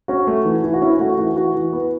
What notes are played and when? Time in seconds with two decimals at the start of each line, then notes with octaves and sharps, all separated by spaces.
0.08 C#4 F#4
0.27 A3
0.45 E3
0.64 E3
0.74 F#4
0.82 C#4 E4
1.00 A3 F#4
1.18 E3 F#4
1.37 E3 F#4
1.55 E3
1.73 B3